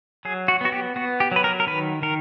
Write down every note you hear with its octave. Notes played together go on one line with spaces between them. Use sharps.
F#3 G#4
F#4
B3 F#4
G4
B3 F#4
G4
F#3 B4
A#4
A#4
D#3 B4
D#3 A#4